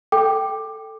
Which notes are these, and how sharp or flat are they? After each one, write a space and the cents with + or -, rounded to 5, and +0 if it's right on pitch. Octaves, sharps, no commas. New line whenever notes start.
A4 +0 G5 +0 D6 +15